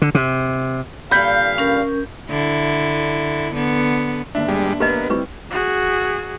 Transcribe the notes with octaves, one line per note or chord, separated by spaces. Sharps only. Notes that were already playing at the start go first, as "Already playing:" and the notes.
D3
C3
G2 A#2 D3 F5 B5 G6 B6
C#4 A#4
D3 E4
D3 B3
G1 D#2 D4 E5
G2 G3 G#3
A#3 B3 G4 B4 D#5
G3 C4 E4 B4 C#6
F#4 G#4